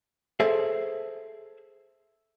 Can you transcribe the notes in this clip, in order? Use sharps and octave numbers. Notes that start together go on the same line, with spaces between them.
G#4 A4 C5 E5